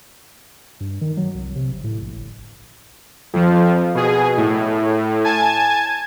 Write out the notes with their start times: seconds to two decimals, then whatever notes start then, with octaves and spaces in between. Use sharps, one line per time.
0.80 G2
1.01 D#3
1.17 F#3
1.35 C2
1.56 C3
1.72 G1
1.84 A2
2.02 A#1
2.16 G1
3.33 F2 F3
3.95 B2 G#4
4.37 A2
5.24 G#5 A5 G#6